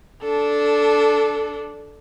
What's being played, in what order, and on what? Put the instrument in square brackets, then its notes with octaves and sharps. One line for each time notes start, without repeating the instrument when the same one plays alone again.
[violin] D4 A4